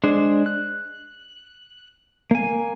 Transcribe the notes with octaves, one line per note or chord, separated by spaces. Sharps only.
G#3 D4 C5
F#6
A#3 G#5